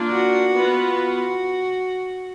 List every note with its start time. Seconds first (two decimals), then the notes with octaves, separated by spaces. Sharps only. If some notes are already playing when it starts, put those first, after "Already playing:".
Already playing: A#3 D4 F4
0.11 F#4
0.53 B3 F4 B4
0.94 F#4